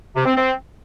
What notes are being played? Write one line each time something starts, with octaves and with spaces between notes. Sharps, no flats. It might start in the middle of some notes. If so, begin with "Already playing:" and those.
C3
C4
C4